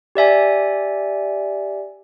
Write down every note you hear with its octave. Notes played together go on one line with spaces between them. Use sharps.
G4 D5 E5 G#5